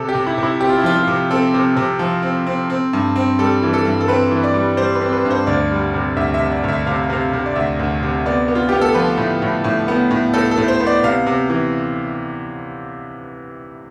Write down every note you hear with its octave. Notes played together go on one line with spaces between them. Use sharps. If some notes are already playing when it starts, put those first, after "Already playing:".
Already playing: C3 A4
G4
C3
E4
C3
E4
C4 G4
F4
E4
F3 F4
F4
C3
C4 A4
C3
C3
F3
C4
C4
C4
G2
C4
G3 A4
E3
A4
G2
A4
C4 B4
E3
D5
G3
G3 C5
B4
C4
B4
G2
C5
D2 D5
G3
C3
D2 E5
E5
C3
D5
D2 E5
C3 F5
C3 F5
C3
D5
D2 E5
D2
C3
B3 D5
B3
F4
B3 G4
A4
F3 B4
A2
A2
A2
B3
A2
A2 A4
A4
A2
C5
B3
D5
C3 F5
C3
E3